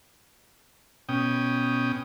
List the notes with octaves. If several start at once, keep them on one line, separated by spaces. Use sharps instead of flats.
B2 C#4 G5 D#6